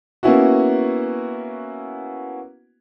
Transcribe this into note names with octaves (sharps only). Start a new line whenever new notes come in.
A#3 B3 C#4 E4 F#4